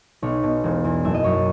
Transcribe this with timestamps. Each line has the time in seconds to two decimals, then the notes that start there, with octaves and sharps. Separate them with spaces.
0.22 B1 C#5
0.43 B2
0.64 E1
0.84 E2
1.04 F#1 E5
1.14 D#5
1.24 F#2 C#5
1.34 D#5